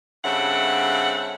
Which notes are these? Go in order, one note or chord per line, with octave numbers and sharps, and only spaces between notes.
G2 C#3 C4 A4 E5 F#5